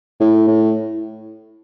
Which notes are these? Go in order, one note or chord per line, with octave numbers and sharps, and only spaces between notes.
A2
A2